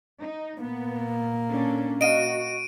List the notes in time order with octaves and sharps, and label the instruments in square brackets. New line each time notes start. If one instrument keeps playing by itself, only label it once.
[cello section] D#4
[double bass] A#2 A#3 [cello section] B3
[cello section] C#4 D4 A4
[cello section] F#4 [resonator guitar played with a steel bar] D#5 F5 [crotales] D7 D#7